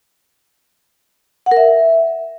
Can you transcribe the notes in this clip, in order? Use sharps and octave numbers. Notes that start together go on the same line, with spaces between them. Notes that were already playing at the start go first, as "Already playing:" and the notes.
F#5
A#4
E5